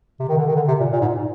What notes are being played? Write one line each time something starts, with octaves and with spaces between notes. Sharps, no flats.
C3
D#3
D3
D#3
D3
C3
A#2
A#2
G#2